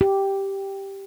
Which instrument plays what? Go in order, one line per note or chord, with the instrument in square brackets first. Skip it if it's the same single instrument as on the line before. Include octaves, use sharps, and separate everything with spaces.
[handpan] G4